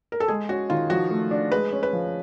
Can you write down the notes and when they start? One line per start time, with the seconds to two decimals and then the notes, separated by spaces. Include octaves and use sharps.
0.12 A#4
0.20 A4
0.28 G#3 G#4
0.49 C#4 F#4
0.70 D#3 F4
0.90 F3 F#4
1.11 A3
1.31 D4
1.52 G#3 B4
1.72 C#4
1.83 B4
1.93 F3